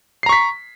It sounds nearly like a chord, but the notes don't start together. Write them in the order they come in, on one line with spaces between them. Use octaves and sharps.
C7 A#5 C#6 B6